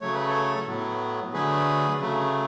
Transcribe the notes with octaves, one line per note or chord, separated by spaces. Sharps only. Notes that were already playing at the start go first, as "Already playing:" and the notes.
C#3 F#3 A3 C#5
B4
A4 C#5
A2 F#3 B3
D3 F#3 A3 G#4 B4
C#3 F#3 A3